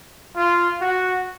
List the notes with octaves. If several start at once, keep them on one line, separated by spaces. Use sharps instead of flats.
F4
F#4